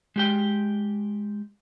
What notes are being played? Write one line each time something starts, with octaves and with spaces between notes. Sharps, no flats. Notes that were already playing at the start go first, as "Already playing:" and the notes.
G#3 G4 G5